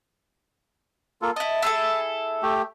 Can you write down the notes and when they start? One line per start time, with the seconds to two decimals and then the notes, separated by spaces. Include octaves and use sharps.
1.22 A#3 F4 A4
1.36 E4 D#5 A5
1.62 E4 G#4 A4
2.43 A3 G4